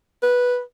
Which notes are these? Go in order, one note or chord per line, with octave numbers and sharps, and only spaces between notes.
B4